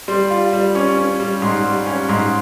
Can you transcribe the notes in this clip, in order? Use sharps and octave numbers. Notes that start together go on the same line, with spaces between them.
G3 C6
F4
G3
C#4 C#6
C#4
G3
G#2 C6
G3
C#4
G#2 C6